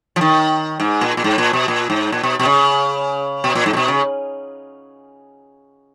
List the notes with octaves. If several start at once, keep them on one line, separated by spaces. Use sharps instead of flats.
F3
D#3
G#2
A#2
A#2
G#2
A#2
B2
A#2
G#2
A#2
B2
B2
C#3
B2
A#2
G#2
A#2
B2
C#3